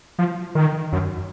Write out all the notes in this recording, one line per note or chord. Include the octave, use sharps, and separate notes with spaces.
F3
D#3
F#2